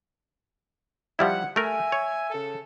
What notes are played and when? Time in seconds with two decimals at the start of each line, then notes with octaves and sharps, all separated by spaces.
1.19 F3 G3 E4 F#5
1.56 A3 A#4 E5 G#5
1.92 C#5
2.30 C#3 A4